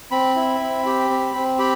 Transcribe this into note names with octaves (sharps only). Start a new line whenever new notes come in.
C4 B5
E4
C4
G4
C4
C4
G4 B5